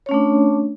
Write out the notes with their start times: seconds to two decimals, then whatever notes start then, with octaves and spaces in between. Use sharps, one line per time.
0.06 C#5
0.09 C#4
0.11 A3
0.14 D4